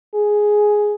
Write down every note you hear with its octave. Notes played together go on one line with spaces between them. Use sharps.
G#4